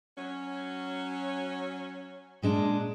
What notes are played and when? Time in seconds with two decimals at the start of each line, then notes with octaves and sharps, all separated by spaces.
0.16 F#3 C#4
2.42 A#2 G#3 D4